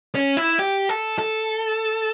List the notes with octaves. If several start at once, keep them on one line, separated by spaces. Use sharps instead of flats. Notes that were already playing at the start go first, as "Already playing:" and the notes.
C#4
E4
G4
A4
A4